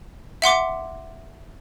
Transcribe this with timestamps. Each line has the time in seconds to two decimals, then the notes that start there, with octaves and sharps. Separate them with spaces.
0.42 E5 F#5 C6 D6